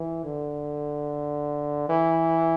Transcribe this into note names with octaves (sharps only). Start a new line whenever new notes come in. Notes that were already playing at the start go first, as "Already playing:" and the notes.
Already playing: E3
D3
E3